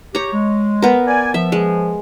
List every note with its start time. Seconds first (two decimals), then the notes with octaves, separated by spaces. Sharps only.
0.15 G4 C#5 A#5
0.33 G#3
0.82 B3 A#4
1.07 D5 G#5
1.34 F3 E5
1.52 G#3